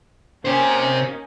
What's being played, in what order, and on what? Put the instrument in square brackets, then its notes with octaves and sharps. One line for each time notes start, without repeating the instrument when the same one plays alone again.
[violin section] A#3 C#4 D#4 [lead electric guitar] G4 C5